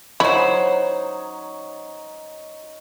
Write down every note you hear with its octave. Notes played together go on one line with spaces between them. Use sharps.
F#3 D#4 E4 C5 C#5